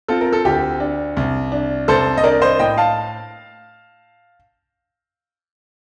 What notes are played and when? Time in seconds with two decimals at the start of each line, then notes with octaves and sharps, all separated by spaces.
0.08 C4 F4 A4
0.21 A#4
0.33 A4
0.45 D2 G4
0.80 D4
1.17 C2
1.52 D4
1.88 C2 A4 C5
2.18 D#5
2.24 D4 A#4 D5
2.42 C5 D#5
2.59 A2 D#5 G5
2.78 F5 A5